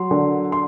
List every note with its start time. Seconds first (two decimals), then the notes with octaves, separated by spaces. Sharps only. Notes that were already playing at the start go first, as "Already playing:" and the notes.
Already playing: F#3 C6
0.11 D3
0.52 C6